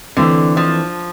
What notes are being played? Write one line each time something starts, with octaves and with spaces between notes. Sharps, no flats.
D3 E3 A3 C4
F3